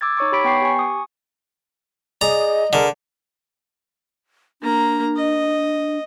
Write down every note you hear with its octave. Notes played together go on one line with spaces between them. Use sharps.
D6 E6 G#6 A6
D#4 C#5 C#6 D6
G4 C#5 B5 B6 D7
B3 G5 C#6 C7
G4 G#5 C#6
D#6
G#4 D5 D#5 A#5
D3 G#4 A#4
A#3 D4 A#5
D#5